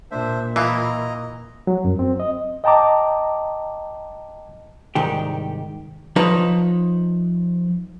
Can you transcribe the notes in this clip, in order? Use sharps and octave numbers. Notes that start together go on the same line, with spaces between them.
A#2 D4 C5 E5
E3 E4 F4 D#5 A#5
F#3
F#2
C4
D#5
D#5 G5 A5 A#5 D6
C2 G#2 D#3 G4
F3 D#4 B4 C#5 A5